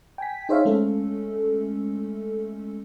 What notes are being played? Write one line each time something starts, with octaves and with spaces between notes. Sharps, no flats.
G5 G#5 B6
D#4 G#4 C5 C#5 E5 F5
G#3 A3 C#4 A4